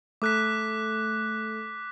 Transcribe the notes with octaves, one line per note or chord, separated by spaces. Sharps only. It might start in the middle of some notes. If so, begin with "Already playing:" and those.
A3 A4 D6 F#6 B6